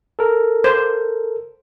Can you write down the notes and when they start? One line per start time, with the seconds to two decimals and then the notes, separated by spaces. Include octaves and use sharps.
0.19 A4 A#4
0.64 C5